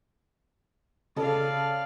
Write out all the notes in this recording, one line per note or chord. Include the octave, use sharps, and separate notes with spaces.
C#3 A4 D5 F5